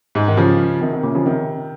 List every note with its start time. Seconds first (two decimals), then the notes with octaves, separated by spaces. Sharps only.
0.15 G#2
0.28 D#3
0.37 C#3 F3
0.81 C3 D#3
0.93 C3 D#3
1.03 A#2 C#3
1.15 C#3 F3
1.25 C3 D#3